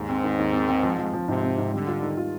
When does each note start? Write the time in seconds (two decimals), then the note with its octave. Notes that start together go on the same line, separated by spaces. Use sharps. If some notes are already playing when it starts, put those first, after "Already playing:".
Already playing: D#2 G#2
0.09 C4
0.24 D#3
0.39 D#2
0.53 C4
0.68 C4
0.83 F3
0.98 F3
1.13 F3
1.28 G#2 C3
1.43 C4
1.58 G#2
1.73 D3 G3
1.88 F4
2.03 D#3
2.17 F4